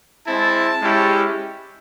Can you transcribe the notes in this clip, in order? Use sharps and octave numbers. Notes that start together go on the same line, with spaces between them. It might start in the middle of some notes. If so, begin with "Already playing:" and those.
G#3 C4 E4 A5
G#3 C#4 E4 G4